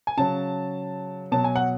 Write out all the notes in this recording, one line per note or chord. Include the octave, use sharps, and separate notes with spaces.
G#5
C#3 F#3 A5
B2 F#3 A5
G#5
F#5